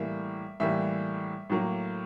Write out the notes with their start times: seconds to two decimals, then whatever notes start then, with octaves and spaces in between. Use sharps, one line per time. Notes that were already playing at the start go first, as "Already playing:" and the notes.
Already playing: A2 E3 G3 A#3 E5
0.60 A2 E3 G3 A#3 E5
1.50 A2 F#3 A#3